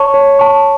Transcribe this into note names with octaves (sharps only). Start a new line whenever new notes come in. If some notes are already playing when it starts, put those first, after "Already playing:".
Already playing: C#5 A5 C#6
C#5
A5 C#6